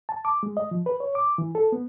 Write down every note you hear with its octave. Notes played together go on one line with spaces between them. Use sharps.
A5
D6
G#3
D#5
F3
B4
C#5
D6
E3
A4
B3